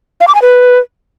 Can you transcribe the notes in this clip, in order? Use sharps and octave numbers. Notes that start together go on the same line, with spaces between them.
F5
D6
G#5
B4